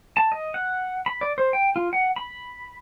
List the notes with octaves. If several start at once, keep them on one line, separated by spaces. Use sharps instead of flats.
A5
D#5
F#5
B5
D5
C5
G5
F4
F#5
B5